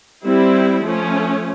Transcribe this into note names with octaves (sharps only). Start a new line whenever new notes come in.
G3 C4 E4
F3 A3 C#4